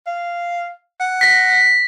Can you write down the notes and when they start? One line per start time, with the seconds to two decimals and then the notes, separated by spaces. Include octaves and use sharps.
0.06 F5
1.00 F#5
1.21 A#6 B6